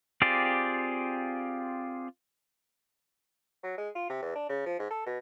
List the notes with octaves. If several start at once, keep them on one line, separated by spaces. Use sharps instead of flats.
C4 F4 G4 G#4 D5
F#3
G#3
F4
C3
E2
D4
C#3
F3
G#2
A4
B2